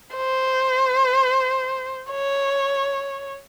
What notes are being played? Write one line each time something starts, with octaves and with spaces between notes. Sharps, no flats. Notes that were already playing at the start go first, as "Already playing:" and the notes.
C5
C#5